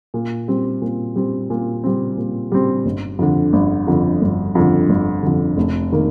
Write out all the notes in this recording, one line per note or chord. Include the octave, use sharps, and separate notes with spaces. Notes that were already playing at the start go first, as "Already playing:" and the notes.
A#2
G3 C4
A#2
G3 C4
A#2
G3 C4
A#2
G3 C4
G1
F2 D3
G1
F2 D3
G1
F2 D3
G1
F2 D3
F1
D#3 A#3